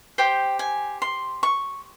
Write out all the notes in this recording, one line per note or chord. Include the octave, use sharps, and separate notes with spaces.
G4 C5 G5
G#5
C6
C#6